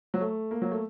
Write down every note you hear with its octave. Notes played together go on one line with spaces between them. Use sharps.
F#3
A3
A#3
F#3
A3